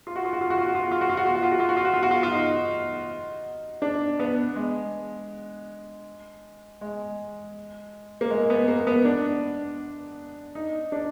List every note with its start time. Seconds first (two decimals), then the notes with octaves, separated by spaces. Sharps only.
0.07 F4
0.16 F#4
0.25 F4
0.33 F#4
0.41 F4
0.50 F#4
0.58 F4
0.66 F#4
0.75 F4
0.83 F#4
0.91 F4
1.01 F#4
1.09 F4
1.17 F#4
1.26 F4
1.35 F#4
1.43 F4
1.51 F#4
1.60 F4
1.69 F#4
1.77 F4
1.85 F#4
1.94 F4
2.03 F#4
2.11 F4
2.23 F4
2.31 D#4
3.82 D4
4.19 B3
4.56 G#3
6.81 G#3
8.21 A#3
8.30 G#3
8.50 B3
8.68 A#3
8.87 B3
9.05 D4
10.55 D#4
10.92 D4